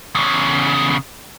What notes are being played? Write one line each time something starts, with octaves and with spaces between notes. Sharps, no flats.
E2 C#3